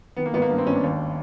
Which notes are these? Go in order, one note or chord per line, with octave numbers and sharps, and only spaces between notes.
D#3 B3
A#3
G#1 B3
A#3
G2 B3
C4
G#1 C#4
D4
D#2